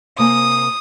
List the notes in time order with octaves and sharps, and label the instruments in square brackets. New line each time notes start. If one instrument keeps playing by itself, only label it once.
[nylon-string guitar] C3 A#3 G#5 [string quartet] D#6